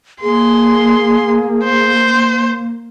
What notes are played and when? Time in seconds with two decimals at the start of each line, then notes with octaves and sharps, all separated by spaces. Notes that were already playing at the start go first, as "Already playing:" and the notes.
0.22 A#3 G#4 C6
1.64 C5